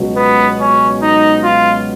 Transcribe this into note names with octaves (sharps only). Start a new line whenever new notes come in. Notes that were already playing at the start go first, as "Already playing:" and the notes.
Already playing: C#2 B2 F#3
B3
C#4
D#4
F4